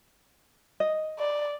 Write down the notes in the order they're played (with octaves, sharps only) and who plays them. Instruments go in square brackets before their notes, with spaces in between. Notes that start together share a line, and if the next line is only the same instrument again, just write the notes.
[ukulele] D#5
[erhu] D5